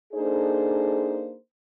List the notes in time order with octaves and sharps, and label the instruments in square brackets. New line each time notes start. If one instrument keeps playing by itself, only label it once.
[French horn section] A#3 D4 D#4 G#4 A4 C5